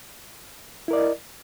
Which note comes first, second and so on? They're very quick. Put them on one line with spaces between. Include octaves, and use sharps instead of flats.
E4 A#4 D5 D#5